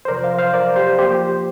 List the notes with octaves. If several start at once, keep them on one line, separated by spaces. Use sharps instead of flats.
C5
F2 C3 F3 A#4 D5
C5 F5
C5 F5
A#4 D5
G4 C5
F3 A#3 G4 C5